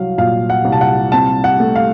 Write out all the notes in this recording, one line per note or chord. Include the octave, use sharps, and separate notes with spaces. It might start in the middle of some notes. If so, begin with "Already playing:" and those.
Already playing: C2 F#3 F5
A#2 F5
F#5
C2
A5
F#5
C4 A5
F#5
A3
F5